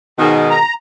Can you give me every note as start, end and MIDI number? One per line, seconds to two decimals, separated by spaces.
0.19 0.55 44
0.19 0.55 47
0.19 0.55 51
0.50 0.74 82